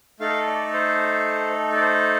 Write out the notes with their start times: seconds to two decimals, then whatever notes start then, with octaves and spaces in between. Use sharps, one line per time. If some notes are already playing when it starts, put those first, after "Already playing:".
0.20 A3 D#4 A4 F5
0.47 D5
0.74 C5
1.76 D5
1.81 C5